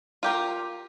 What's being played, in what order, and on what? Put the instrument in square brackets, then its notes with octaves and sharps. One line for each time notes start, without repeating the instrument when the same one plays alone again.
[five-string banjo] F4 G4 A#4